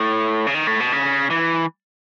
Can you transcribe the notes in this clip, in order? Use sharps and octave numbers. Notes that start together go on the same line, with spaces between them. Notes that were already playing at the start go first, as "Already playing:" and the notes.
Already playing: A2
C#3
D#3
A2
B2
C#3
E3